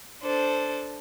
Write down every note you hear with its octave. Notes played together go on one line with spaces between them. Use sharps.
D4 A4 C5